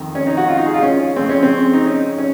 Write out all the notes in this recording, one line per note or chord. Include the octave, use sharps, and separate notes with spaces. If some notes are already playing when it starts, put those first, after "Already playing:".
Already playing: F2 D#3
C#4
D#4
F#4
F4
D#4
G#4
F4
C#4
F2 C#3 C4
C#4
C4
D#4
C#4
C#4